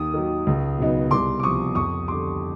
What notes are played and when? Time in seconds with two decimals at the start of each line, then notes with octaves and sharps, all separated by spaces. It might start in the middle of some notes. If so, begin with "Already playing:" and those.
Already playing: D#2 D#6
0.14 D#3 F#3
0.47 C#2
0.78 B2 F#3 B3 D#4
1.11 C2 C6 D6
1.40 D6
1.43 C3 F3 C#6 D#6
1.75 F2 C#6 D#6
2.08 D3 G3 C6 D6